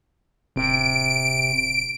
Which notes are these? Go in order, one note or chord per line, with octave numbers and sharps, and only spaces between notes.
D1 C3 D7